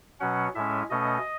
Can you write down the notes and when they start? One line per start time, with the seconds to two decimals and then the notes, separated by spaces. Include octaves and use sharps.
0.20 B2 F#3 C#4 F#5
0.55 A2 G#3 C#4 E5
0.90 B2 A3 C#4 D#5